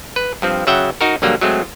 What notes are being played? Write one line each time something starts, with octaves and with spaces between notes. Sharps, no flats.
B4
G2 F3 C4
C#3 F#3 E5 F#5 G5
D#4 F#4 A#4
A#1 D3 F#3 G3 A#3
F#3 G#3 A3 C4